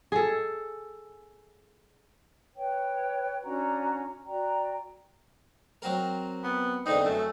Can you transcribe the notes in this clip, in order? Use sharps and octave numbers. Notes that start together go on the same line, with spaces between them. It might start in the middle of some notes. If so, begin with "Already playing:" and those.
G#4 A4
B4 C#5 G5
C#4 D4 F#4 A#5
F#4 D5 G5 A#5
F#3 C4 A#4
B3
E2 D3 C4 D#4
F#2 A3